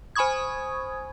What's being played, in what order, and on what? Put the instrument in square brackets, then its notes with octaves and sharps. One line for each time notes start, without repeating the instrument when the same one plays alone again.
[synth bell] C5 G#5 B5 C#6 D#6 G#6